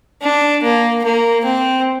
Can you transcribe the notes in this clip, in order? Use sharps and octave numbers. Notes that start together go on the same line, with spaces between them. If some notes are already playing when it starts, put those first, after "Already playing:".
D4
A#3
A#3
C4